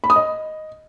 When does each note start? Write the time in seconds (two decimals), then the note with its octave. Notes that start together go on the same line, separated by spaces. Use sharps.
0.04 B5
0.10 D#6
0.16 D#5